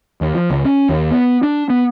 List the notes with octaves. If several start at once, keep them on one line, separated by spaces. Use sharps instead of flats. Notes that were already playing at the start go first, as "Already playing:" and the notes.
D#2
F3
C#2
C#4
D#2
B3
D4
B3